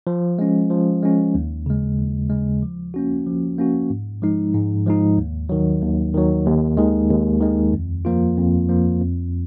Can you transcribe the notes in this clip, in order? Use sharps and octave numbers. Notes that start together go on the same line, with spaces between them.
F3
G#3 C#4
F3
G#3 C#4
D#2
C#3 G#3
D#2
C#3 G#3
F3
A#3 C#4 F#4
F3
A#3 C#4 F#4
G#2
F3 G#3 D#4
G#2
F3 G#3 D#4
D#2
D#3 F#3
D#2
D#3 F#3
D#2
D#3 G#3
D#2
D#3 G#3
F2
F3 A#3 F4
F2
F3 A#3 F4
F2